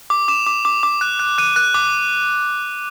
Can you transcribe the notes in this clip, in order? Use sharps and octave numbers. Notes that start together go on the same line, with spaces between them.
D6
D6 E7
D6
D6
D6
F#6
F#6
F#6 D#7
F#6
D6